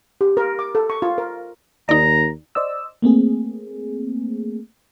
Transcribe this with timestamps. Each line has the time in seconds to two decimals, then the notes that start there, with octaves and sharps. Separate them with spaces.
0.21 G4
0.37 A#4
0.59 D6
0.75 A4
0.90 C#6
1.02 F4
1.18 A#4
1.89 D#2 D#4 D5 A#5
2.55 C5 D5 D#5 E6
3.02 A3 A#3 C4 G#4